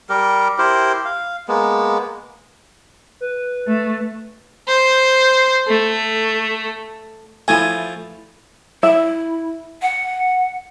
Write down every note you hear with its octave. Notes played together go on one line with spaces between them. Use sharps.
G3 G4 A#4
E4 G4 A#4 C5
F5
G#3 A#3 B3
B4
A3
C5
A3
F3 A3 E4 G#5
E4 E5
F#5